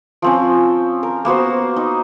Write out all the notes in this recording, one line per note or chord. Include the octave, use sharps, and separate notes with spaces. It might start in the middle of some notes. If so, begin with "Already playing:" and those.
F3 C4 C#4
A#4
A#3 B3 F#4 C5
D#4